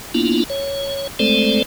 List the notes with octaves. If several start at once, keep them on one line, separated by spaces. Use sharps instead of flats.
A#3 B3 D4 E4 F4
C#5
G#3 A3 C4 A4 C5 D5